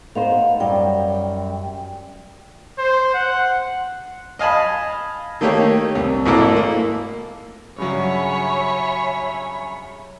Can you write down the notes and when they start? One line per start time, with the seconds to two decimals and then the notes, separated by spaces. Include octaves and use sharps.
0.15 B3 D#4 C5 F5
0.60 F#2 G3 G5
2.79 C5
3.15 F#5
4.39 D#5 F5 G#5 A5 B5
5.41 D#3 A3 A#3 G4 C#5
5.95 C2
6.26 G#1 G#2 A#3 E4 A4 D6
6.56 A#3
7.78 G2 C#3 F#3 C#5 E5 G#5 B5